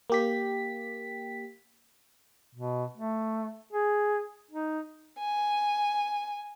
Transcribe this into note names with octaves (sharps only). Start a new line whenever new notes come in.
A#3 G4 B6
B2
A3
G#4
D#4
G#5